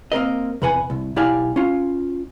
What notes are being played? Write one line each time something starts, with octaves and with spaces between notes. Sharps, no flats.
A#3 C4 A#4 D#5
E2 C3 B4 F#5 G#5
C2
B1 E4 G4 D5 F5 G#5
C#4 F4